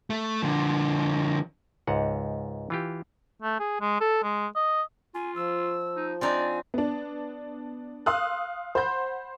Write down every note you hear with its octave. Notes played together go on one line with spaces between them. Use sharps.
A3
D3 F3
C#2 G#2 F#5
E3 F4 G4
A3
G#4
G#3
A4
G#3
D#5
F4 G#5
F3 E6
D#4
C4 D4 D#4 D5 G#5
B3 D4
F5 C6 D#6 E6 F#6
C5 F#5 B5 C6 G6